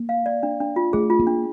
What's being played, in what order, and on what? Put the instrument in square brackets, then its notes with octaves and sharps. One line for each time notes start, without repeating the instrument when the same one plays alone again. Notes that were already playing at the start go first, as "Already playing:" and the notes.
Already playing: [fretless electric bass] A#3
[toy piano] F5
D5
D4
D4
F4
[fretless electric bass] A3 [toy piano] G#4
[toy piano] F4
[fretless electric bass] A#3
[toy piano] D4